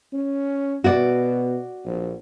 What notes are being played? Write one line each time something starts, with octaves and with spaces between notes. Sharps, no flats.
C#4
B2 F#4 D5
A#1